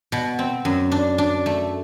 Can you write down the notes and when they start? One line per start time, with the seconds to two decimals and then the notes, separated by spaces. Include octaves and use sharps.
0.12 B2
0.39 C4
0.65 F#2
0.92 D4
1.18 D4
1.46 A3